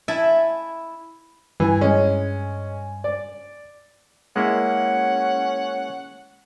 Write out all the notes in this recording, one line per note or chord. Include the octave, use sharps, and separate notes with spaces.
E4 E5 G#5 A5
G2 E3 G#5
G#3 C#4
D5
G#3 A#3 C#4 E4 F#5